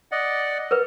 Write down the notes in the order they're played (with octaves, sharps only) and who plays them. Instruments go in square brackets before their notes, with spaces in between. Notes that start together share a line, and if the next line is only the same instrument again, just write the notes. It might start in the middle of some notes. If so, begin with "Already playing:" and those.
[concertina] D5 D#5 F#5
[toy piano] A#4 B4